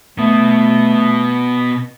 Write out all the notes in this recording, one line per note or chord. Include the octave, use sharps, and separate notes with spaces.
B2 A3 B3